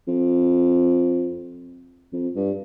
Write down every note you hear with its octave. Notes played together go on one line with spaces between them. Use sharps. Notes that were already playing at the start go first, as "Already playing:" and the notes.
F2
F2
G2